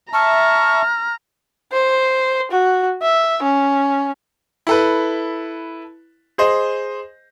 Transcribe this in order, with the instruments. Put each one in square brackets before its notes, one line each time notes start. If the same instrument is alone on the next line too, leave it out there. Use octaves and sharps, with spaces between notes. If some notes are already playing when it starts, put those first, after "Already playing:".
[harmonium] E5 A5 [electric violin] A#5 [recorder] C#6 [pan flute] F6
[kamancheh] C5
F#4
E5
C#4
[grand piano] E4 A4 B4
G#4 C5 D#5